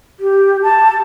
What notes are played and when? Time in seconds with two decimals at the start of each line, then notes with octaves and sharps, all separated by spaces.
0.20 G4
0.63 A5